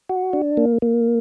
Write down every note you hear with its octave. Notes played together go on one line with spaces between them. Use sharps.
F#4
D4
A#3
A#3